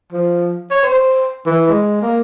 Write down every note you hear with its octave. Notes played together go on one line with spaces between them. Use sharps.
F3
C#5
C5
E3
G#3
A#3